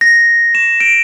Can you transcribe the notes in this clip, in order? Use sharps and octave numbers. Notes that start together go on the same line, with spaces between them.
A#6
E7
D7